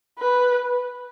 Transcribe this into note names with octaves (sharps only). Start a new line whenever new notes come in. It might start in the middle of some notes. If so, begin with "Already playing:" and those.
B4